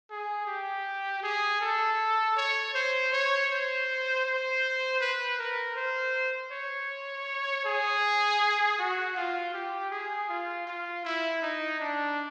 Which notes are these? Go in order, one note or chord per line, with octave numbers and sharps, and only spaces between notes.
G#4
G4
G#4
A4
C#5
C5
C#5
C5
C5
B4
A#4
C5
C#5
G#4
F#4
F4
G4
G#4
F4
F4
E4
D#4
D4